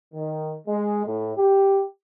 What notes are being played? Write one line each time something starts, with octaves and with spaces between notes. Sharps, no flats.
D#3
G#3
A2
G4